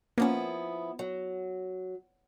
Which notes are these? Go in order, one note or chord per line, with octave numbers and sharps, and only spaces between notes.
F3 A#3 B3 C#4 E4
F#3